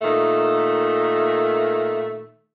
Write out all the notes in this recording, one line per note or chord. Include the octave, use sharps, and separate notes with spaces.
A#2 D#3 A3